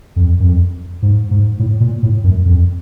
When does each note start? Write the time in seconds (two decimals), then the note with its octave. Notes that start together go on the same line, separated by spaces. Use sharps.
0.16 F2
0.40 F#2
0.44 F2
1.02 G#2
1.31 G#2
1.59 A2
1.80 A#2
2.03 A2
2.24 F#2
2.46 F2